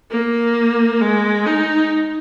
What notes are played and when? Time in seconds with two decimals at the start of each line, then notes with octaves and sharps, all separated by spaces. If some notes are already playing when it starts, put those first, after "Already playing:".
0.11 A#3
1.01 G#3
1.46 D#4